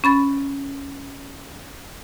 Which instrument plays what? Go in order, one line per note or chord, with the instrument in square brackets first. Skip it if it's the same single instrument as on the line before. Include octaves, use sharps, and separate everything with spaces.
[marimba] C#4 B5 A6